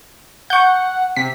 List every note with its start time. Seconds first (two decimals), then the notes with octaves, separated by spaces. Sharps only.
0.50 F#5 C#6 G6
1.16 C3 B6